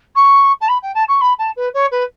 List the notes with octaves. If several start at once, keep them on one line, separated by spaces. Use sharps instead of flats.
C#6
A5
B5
G5
A5
C#6
B5
A5
B4
C#5
B4